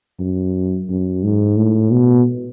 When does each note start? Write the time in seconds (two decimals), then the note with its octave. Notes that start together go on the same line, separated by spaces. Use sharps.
0.19 F#2
0.89 F#2
1.23 G#2
1.57 A2
1.91 B2